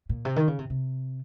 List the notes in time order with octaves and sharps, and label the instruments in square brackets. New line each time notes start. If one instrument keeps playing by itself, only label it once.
[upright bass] A#2
C3
D#3
C#3
C3
C3